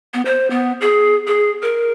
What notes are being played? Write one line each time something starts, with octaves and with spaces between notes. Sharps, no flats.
B3
C5
B3
G#4
G#4
A#4